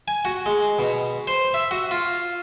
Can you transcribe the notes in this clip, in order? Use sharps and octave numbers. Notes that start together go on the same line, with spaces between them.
G#5
F#4
G#3
B2
C5
E5
F#4
F4